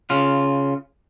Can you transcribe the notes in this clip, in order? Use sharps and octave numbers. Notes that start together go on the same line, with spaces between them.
C#3 F4